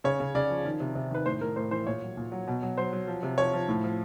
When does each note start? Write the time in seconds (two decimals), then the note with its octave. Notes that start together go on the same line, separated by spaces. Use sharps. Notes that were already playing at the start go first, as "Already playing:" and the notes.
0.04 C#3 C#5
0.20 C#3
0.35 C#3 D5
0.50 F3
0.65 D#3
0.80 C3
0.95 C3
1.11 D#3 B4
1.26 A2 C5
1.41 A2 A#4
1.56 A2 C5
1.71 E3 C5
1.87 A#2 C#5
2.02 F#3
2.17 A#2
2.32 F#3
2.47 B2
2.62 F#3
2.77 F#3 C5
2.93 F#3
3.07 F3
3.23 C3
3.38 F3 C#5
3.53 F3
3.68 A2
3.84 F3